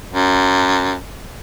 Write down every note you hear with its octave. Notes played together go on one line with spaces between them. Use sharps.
F#2